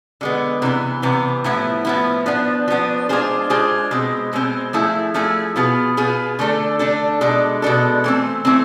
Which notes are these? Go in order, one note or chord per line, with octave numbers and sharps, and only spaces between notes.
D3 G#3 B3
C3 E3 B3
C3 E3 B3
A2 F3 B3 E4
A2 F3 B3 E4
F3 B3 D4
F3 B3 D4
G#3 D4 F4 G#4 C5
G#3 D4 F4 G#4 C5
B2 G#3 C4
B2 G#3 C4
F3 A3 E4 G#4
F3 A3 E4 G#4
B2 B3 F4 G#4
B2 B3 F4 G#4
D3 A3 D4 A4
D3 A3 D4 A4
B2 G#3 D4 A4
B2 G#3 D4 A4
E3 A3 C4
E3 A3 C4